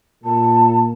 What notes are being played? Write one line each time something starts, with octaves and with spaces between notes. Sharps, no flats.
A#2 A5